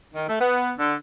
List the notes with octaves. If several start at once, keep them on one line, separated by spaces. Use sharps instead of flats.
D#3
A3
B3
D3